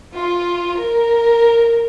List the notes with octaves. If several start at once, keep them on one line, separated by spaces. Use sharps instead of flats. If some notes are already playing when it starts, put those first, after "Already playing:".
F4
A#4